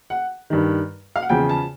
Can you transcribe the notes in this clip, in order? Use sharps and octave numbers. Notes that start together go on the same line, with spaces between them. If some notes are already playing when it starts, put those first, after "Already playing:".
F#5
G2 D#3
F5
F#5
E2 C#3 F3 G5
A5